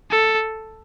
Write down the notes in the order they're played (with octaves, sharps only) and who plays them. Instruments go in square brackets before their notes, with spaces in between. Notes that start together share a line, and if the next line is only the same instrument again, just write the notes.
[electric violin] A4